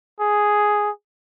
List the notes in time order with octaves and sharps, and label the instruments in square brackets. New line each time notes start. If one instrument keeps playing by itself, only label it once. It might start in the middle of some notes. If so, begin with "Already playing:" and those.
[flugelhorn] G#4